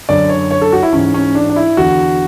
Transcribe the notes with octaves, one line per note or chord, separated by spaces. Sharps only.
F#2 D3 D5
C#5
C#5
A4
F#4
E4
G#2 E3 C#4
C#4
D4
D4
E4
E2 D3 F#4